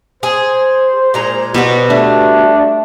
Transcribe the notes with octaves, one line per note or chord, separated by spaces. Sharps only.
G#4 C5
A#2 G#3 A#5
B2 G3 B3 F#4
A3 D4